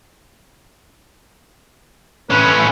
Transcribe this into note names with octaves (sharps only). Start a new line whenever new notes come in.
A2 C#4 B4